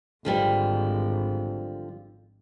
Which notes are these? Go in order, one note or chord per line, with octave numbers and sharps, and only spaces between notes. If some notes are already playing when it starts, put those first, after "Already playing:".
G#1 D3 F3 G3